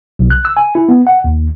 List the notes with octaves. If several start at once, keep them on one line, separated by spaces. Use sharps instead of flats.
B1
F#6
E6
G#5
E4
B3
F#5
D#2